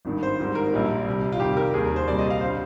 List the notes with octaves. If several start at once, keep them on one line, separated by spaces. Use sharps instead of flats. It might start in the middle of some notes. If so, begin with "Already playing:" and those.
G#1 G2 D#3
C5
G#1 G#2 D#3 G3
A#4
A#1 A#2 G3
C2 C3 G3
F4
F2 C3 D#3 G3 G4
A#4
D#2 D#3 G3 G#4
A#4
C5
C2 A#2 G3 D5
D#5
F5
D3 G3 C5